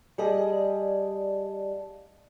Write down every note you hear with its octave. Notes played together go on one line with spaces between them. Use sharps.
G3 G#4 D5 D#5 F5 A5